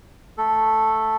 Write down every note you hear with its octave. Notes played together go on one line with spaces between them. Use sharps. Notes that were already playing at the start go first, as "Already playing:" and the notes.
A3 A4